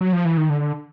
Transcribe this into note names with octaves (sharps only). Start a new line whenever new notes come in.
F#3
F3
E3
D#3
D3